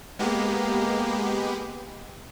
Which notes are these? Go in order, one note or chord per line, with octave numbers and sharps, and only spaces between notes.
G#3 A#3 B3 G4